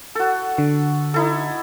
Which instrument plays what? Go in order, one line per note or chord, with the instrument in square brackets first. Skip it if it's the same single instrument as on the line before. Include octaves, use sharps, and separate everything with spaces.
[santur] F#4 A4
[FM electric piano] D3
[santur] D#4 E4 A4